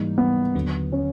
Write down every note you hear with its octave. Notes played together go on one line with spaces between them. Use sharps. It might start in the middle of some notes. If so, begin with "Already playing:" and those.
Already playing: G#2 E3 G3 A#3 D#4
B3
D#2 D3 F#3 B3
C#4